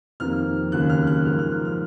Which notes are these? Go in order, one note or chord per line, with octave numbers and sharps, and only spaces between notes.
F2 C3 D#3 A#3 F6
D#2 C#3 F#3 A#3 F#6
F6
F#6
G#2 F3 A#3 F6
F6
F6